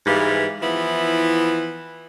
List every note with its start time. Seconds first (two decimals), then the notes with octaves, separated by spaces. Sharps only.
0.06 G#2 E3 G3 B4 F5
0.61 E3 F3 B3 E4